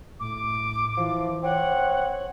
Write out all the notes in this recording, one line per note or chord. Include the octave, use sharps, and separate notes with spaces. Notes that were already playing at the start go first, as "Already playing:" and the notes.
A2 D6
E3 F3
C4 C#5 F#5